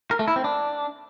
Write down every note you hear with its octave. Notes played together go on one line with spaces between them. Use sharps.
A#4
A3
E4
C4
D4